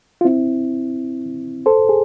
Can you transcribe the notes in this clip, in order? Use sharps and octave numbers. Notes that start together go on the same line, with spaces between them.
F4
C4 E4
A4 C5
G#4